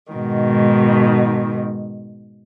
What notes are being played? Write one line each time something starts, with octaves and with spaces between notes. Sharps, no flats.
G#2 B2 D#3